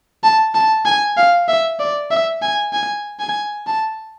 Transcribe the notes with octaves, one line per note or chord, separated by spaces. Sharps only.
A5
A5
G#5
F5
E5
D5
E5
G#5
G#5
G#5
A5